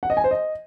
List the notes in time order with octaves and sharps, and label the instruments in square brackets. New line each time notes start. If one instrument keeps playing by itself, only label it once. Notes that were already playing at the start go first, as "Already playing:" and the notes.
[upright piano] F#5
D#5
G#5
C5
D#5